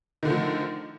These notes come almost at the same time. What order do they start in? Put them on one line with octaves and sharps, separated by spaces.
D#3 D3 A3 F3